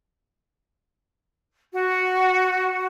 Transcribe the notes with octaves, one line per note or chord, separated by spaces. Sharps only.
F#4